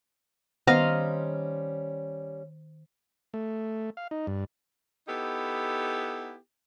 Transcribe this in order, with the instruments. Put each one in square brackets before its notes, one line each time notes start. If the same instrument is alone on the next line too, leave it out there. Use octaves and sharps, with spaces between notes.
[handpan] D#3 C5 [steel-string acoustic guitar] G3 C#4 [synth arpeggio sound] B3 [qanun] D#5 F5 A#5
[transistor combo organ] A3
F5
D#4
G2
[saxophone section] B3 D#4 E4 G4 A4